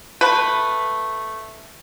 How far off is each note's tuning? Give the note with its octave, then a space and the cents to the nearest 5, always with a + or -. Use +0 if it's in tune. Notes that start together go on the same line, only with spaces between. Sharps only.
A3 +0 B4 +0